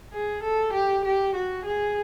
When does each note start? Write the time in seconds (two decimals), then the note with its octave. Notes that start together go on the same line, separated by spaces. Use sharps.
0.13 G#4
0.43 A4
0.73 G4
1.05 G4
1.35 F#4
1.65 G#4